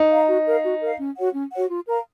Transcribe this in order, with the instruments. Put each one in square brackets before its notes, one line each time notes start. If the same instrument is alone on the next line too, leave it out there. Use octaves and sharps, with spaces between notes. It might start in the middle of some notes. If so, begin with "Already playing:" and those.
Already playing: [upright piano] D#4
[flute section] F5 A#5
F#4
A#4 F5
F#4
A#4 F5
C#4
F#4 C#5 F#5
C#4
F#4 C#5 F#5
F4
A#4 F5 A#5